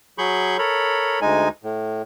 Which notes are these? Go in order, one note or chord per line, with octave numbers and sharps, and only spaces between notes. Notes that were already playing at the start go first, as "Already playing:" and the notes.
F#3 G#4 B5 C#6 G6
A4 A#4 C#5 B5
D2 G#3 D#4 G#5
A2